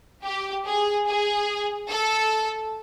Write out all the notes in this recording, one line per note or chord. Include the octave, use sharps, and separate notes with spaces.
G4
G#4
G#4
A4